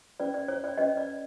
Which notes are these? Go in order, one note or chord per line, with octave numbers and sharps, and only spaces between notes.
C#4 F#4 B4 D5
D5
C#5
D5
C#4 F#4 B4 D#5
D5